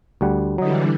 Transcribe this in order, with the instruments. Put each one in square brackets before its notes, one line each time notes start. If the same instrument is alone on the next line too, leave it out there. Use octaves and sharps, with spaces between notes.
[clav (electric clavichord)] D2 G3 F#5
[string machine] D3 E3 G3 [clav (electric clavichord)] F#3 D#5